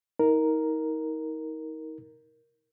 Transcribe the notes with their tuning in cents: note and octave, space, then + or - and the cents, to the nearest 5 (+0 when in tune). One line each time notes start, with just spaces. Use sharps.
D#4 +35 A#4 +0